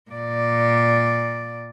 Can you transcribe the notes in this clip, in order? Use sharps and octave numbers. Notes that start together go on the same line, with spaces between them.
A#2 D5